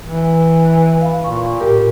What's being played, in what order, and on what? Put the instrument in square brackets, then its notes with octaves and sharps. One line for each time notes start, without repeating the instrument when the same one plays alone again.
[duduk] E3
[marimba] F5 B5
[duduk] A#2 [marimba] C#6
[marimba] A2 A#4 [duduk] G4